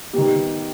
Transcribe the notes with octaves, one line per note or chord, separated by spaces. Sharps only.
D#3 G3 B3 G4